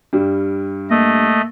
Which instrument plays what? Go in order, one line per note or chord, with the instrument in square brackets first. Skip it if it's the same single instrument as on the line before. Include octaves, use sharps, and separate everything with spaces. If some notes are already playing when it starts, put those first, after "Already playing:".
[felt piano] G2 G3
[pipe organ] A3 D#5 [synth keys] A#3